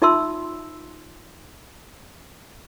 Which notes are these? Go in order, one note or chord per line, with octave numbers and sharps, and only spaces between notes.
D#4 F4 E5 A5 C6 E6